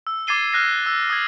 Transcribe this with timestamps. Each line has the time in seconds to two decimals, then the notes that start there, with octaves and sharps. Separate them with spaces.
0.07 E6
0.27 D6 G#6 A6 C7 D#7 G7
0.53 F6 F#6 A#6 C7
0.86 E6
1.10 D#6 G#6